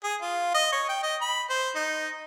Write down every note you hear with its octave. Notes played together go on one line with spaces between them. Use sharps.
G#4
F4
D#5
C#5
G5
D#5
B5
C5
D#4